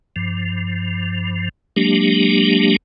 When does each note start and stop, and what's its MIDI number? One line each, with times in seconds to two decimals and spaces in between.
0.16 1.49 43
0.16 1.49 53
1.76 2.76 54
1.76 2.76 56
1.76 2.76 58
1.76 2.76 62
1.76 2.76 67